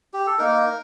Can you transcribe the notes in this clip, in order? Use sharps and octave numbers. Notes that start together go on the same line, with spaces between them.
G4
A4
A#3 D#4 A#4